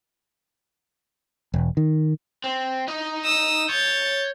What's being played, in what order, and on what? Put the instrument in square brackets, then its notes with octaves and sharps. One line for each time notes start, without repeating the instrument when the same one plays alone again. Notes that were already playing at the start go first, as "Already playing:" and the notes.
[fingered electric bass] E1
D#3
[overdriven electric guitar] C4
D#4 D#5
[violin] D#6 E6
[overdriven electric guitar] C#5 [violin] G6 A6